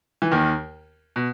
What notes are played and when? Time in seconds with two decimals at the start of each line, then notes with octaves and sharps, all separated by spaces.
0.22 E3
0.31 D#2 D#3
1.16 B2